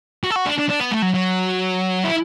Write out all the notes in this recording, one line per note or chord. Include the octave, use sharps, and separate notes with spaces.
F#4
A4
F#4
D4
D4
D4
B3
A3
F#3
F#3
E4